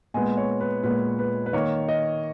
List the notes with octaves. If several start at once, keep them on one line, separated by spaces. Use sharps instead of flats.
A#2 G#3 B3 G#5
C#5
B4
A#2 G#3 B3 B4
B4
B4
D#3 A#3 C#5
D#5